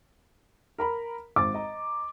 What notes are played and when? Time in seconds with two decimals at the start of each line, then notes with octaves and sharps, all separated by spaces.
0.78 A#4 A#5 B5
1.36 G#1 D6 A6
1.54 D#5 A#5